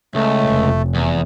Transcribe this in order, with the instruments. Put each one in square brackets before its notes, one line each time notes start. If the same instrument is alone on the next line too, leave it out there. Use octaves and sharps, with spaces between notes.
[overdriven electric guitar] C#2 [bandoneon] A3
[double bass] F1
[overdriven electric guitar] E2